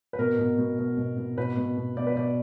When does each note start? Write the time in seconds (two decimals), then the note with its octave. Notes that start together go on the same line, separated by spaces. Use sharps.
0.13 B4
0.19 B2 A#4
0.39 B2
0.58 B2
0.79 B2
0.97 B2
1.17 B2
1.37 B2 B4
1.57 B2
1.77 B2
1.96 B2 D5
2.07 B4
2.16 B2 D5